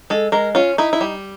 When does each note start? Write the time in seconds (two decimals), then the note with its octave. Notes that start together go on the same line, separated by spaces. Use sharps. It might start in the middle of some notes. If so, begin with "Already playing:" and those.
0.10 G#3 A4
0.32 G#3 A#4
0.55 C#4 F4
0.78 D#4 E4
0.93 E4
1.01 G3